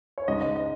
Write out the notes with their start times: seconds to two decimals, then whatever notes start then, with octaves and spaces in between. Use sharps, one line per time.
0.18 C#5
0.28 C#2 C#3 G#3 D#4 D#5
0.41 D#5
0.56 D#5